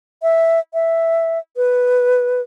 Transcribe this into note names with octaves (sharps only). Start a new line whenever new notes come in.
E5
E5
B4